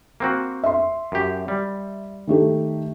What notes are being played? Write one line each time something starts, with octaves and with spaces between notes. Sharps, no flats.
A#3 C4 F#4
E5 C6
F#2 G4
G3
D#3 A3 G4